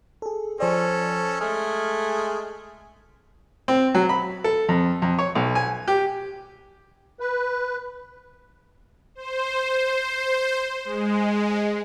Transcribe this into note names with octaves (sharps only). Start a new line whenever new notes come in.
G#4 A4
F3 C#4 A4 C5 D5
G#3 A3 G#4 F6
C4
F#3
B5
A4
F2
F2
C#5
B1
G#5
G4
B4
C5
G#3